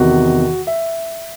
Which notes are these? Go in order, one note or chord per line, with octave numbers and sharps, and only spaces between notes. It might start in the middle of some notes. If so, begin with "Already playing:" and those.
Already playing: E2 C3 D#3 F#4
E5